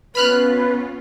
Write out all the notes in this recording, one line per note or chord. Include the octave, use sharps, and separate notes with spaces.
B3 C#4 F4 B4 B5 F6 F#6